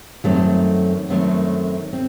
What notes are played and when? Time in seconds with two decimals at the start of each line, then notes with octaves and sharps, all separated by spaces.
0.24 F#2 D#3 F#3 A3 C4
1.09 F#2 D#3 F#3 A3 C4
1.93 C4